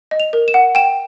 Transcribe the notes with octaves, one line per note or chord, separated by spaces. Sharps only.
D#5
F7
A#4
E7
F#5
G5 E7